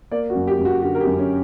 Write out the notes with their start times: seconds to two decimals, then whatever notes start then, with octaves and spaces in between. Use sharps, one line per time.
0.11 A#3 D5
0.30 F#4
0.35 F#2
0.47 G4
0.59 F#2
0.65 F#4
0.82 D3 F#4
0.95 A#4
1.01 G4
1.06 F#2
1.19 C#4